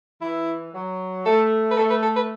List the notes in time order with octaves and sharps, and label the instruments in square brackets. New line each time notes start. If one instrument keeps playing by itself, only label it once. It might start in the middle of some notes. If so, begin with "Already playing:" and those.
[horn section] E3 [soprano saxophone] E4
[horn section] F#3
[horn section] A3 [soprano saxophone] A4
[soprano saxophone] B4
[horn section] A3 [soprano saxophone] A4
[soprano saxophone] B4
A4
B4